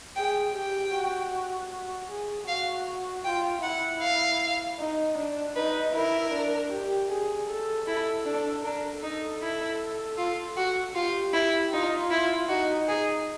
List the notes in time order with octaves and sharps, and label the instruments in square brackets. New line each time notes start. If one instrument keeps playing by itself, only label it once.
[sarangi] G#4 [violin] G5
[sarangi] G4 [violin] G5
[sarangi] F#4
F#4
G#4
[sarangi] F#4 [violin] F5
[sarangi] F4 [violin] G5
[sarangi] E4 [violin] F#5
[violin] F5
[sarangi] D#4
D4
[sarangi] D#4 [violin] B4
[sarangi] E4 [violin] A#4
[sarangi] D4
G4
G#4
A4
[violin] E4 [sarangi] A4
[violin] D4 [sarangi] A4
[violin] D4 [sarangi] A#4
[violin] D#4 [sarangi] A4
[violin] E4
F4
F#4
[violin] F4 [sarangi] G4
[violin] E4
[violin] D#4 [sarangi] F4
[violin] E4
[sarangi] D#4 [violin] F#4
[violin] G#4